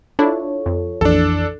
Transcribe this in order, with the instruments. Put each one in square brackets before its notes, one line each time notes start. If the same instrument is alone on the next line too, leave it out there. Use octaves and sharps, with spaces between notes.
[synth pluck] D4 E4 [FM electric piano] F4 A4 C#5
[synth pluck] F2
[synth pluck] A#1 [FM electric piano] F2 E3 [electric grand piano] D4 A4